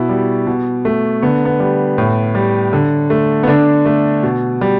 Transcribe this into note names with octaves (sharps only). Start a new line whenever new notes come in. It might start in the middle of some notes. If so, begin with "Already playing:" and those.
Already playing: B2 E4
G3
B2
A3
D3 B3
B3
G3
A2
G3
D3
A3
B3
D3 D4
A3
B2
G3